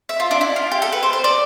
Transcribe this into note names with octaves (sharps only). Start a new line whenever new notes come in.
E5
F4
D4
E4
F4
G4
A4
B4
C5
C5
D5